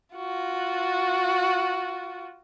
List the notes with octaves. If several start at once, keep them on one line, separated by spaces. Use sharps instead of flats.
F4 F#4